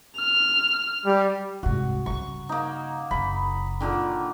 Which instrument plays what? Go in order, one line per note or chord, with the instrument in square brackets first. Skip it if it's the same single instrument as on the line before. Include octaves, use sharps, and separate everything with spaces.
[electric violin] F6
[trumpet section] G3
[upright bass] C2 G#2 [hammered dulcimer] F#4
[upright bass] G2 C#3 [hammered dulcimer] C#6
[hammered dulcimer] A#3 D#4
[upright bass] F#1 C#3 [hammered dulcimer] B5
[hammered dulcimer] A#2 D3 D#3